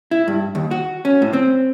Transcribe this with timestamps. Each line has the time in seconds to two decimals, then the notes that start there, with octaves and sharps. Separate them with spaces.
0.11 E4
0.28 G2
0.55 D#2
0.71 F#4
1.05 C#4
1.22 A2
1.33 C4